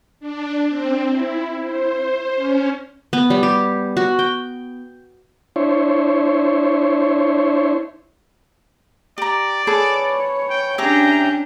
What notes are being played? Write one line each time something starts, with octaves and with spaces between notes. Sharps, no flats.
D4
C4
E4
C5
C#4
B3
G3
G4
F#4
G5
D4 E4 C5 C#5
G4 D5 A#5
G#4 A4 B4 C#5
G5
C#4 D4 G4 G#4 E5 G5 A#5